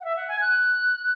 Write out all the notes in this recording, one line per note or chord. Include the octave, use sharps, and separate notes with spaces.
F#5
E5
F#5
G#5
F#6